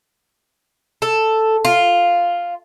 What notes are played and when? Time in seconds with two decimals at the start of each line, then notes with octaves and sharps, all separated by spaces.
1.02 A4
1.65 F4